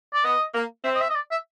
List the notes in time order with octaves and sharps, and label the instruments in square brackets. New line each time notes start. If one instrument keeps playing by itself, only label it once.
[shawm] D5
[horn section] B3 [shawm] D#5
[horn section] A#3
[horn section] C4 [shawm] E5
[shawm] D#5
E5
D#5
D5
E5